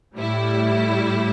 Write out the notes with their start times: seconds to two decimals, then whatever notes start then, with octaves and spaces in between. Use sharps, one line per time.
0.16 A2 G3 E4